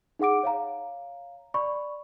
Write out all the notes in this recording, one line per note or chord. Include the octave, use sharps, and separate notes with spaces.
D#4 G#4 F#5 D6 D7
C#5 F5 A#5
D5 B5 C#6